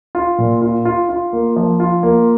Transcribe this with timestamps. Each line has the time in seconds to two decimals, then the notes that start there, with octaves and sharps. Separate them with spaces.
0.15 F4
0.38 A#2
0.62 F4
0.85 F4
1.09 F4
1.33 A#3
1.56 F3
1.80 F4
2.03 A#3